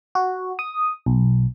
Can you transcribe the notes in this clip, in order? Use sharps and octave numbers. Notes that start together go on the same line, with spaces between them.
F#4
D#6
B1